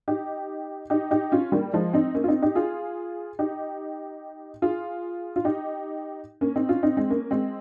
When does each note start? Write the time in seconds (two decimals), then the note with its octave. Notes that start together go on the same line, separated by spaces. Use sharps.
0.08 D#4 G4
0.90 D#4 G4
1.11 D#4 G4
1.32 C#4 F4
1.52 G3 A#3
1.73 F3 G#3
1.93 C4 D#4
2.14 A#3 C#4
2.24 F4
2.28 C4 D#4
2.42 D#4 G4
2.55 F4 G#4
3.39 D#4 G4
4.62 F4 G#4
5.36 F4
5.45 D#4 G4
6.41 A#3 C#4
6.56 C4 D#4
6.69 C#4 F4
6.83 C4 D#4
6.97 G#3 C4
7.10 A#3 C#4
7.31 G#3 C4